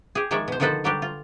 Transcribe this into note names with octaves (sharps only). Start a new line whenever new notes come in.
G4 G#4
D#3 F3 G#3 C#5 D5 E5
B2 C5
D3 D#3 F3 A4 B4 C5
D3 F#3 G3 D4 G4
F4